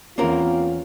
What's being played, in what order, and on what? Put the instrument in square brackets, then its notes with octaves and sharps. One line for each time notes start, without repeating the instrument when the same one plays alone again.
[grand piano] E2 C#4 [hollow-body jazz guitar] A#3 C4 A#4 [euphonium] F4